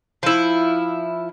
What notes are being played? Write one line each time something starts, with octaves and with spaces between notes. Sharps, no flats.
F3 E4